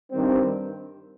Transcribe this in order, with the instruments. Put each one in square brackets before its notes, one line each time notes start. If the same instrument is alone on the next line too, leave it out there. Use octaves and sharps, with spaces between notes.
[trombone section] G2 D#3 G3 C4